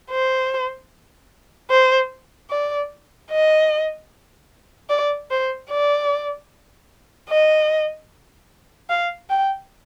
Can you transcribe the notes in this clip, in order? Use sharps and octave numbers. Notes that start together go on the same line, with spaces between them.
C5
C5
D5
D#5
D5
C5
D5
D#5
F5
G5